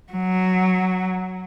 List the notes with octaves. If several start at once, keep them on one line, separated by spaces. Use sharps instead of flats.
F#3